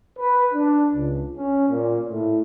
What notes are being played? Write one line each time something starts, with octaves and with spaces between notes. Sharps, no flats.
B4
D4
C#2
C#4
A#2
A2